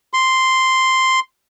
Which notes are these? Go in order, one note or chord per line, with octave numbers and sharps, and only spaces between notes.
C6